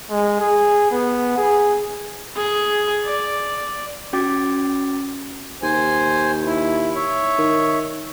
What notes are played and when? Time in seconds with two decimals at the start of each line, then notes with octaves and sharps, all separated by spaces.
0.10 G#3
0.40 G#4
0.91 B3
1.37 G#4
2.36 G#4
3.04 D5
4.13 C#4 F#4 G5 D6 A6
5.63 D#2 C5 G#5
6.45 E4
6.96 C#5 E5
7.38 D#3